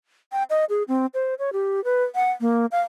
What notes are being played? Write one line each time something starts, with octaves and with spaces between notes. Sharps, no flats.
G5
D#5
G#4
C4
C5
C#5
G4
B4
F#5
A#3
F5